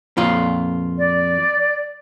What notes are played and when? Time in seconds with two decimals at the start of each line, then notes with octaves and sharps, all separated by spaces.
0.17 F2 A#2 F4
0.97 D5